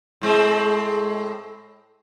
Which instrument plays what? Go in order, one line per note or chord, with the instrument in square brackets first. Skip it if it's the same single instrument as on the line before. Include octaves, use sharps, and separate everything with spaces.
[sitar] A2 G#3 C4